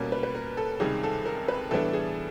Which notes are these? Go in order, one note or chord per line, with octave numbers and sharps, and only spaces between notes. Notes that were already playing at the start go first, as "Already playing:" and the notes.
Already playing: B2 G3 A#3 C#4
B4
B4
A#4
A4
C#2 C3 D#3 G3 G#4
A4
A#4
B4
A2 E3 G3 B3 D4 A4
G#4